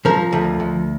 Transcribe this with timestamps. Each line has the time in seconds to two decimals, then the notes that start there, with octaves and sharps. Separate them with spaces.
0.05 F3 A#4
0.32 D2
0.60 D2